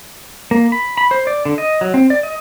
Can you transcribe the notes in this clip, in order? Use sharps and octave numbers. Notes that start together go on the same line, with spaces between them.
A#3
B5
B5
C5
D5
D3
D#5
F#3
C4
D5
D#5